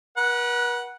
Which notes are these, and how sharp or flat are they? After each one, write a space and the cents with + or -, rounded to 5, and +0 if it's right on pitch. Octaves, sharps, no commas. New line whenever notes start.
B4 -45 F#5 +0